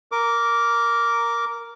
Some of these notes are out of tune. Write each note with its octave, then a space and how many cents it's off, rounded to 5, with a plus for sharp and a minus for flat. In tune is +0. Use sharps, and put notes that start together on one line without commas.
A#4 +0 D6 -15